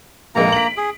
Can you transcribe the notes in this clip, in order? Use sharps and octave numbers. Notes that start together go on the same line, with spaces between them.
F1 A#1 G#3 A#3 A#5
B6 D7 F#7
G#4